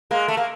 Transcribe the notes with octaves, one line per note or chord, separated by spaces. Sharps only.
G#3 A#3
A3
A#3